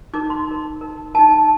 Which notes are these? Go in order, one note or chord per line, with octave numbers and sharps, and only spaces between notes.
D#4 A#4 D6
C6
D#4 A#4
D#4 A#4
D#4 A#4 A5
A5